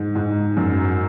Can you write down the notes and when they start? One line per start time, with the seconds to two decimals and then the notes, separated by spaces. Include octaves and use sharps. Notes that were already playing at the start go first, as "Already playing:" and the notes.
Already playing: G#2
0.15 G#2
0.57 F#2